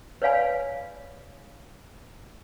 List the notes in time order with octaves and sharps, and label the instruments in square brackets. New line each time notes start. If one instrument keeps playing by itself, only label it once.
[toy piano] B4 C#5 D5 F5 G#5 B5